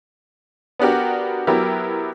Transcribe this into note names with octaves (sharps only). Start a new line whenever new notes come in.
B3 D4 F#4 G4 A#4
F#3 B3 E4 G4 A#4